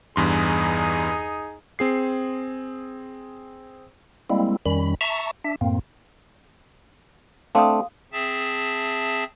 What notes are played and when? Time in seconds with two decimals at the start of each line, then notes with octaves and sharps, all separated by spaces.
0.16 E2 G2 D#4 G#4 C6
1.79 C4 G#4 C7
4.30 G3 G#3 A#3 C4 E4
4.66 F2 D#3 G3 C#4 B5
5.01 E5 A5 A#5 C#6
5.44 D4 E5
5.61 F#2 A2 A#3 C4
7.55 A3 C4 D4 F5 D#6
8.12 C4 G#4 E5 A5